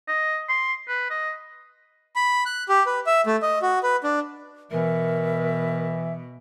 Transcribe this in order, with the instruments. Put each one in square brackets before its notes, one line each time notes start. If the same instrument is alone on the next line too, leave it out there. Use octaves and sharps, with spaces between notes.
[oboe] D#5
C6
B4
D#5
[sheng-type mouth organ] B5
F#6
G4
B4
E5
A3
D#5
F#4
B4
D4
[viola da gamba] B2 [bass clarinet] E3 [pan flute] A#4 [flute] E5